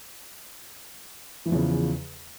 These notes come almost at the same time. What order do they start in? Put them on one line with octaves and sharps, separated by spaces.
E3 F3 E2 C#3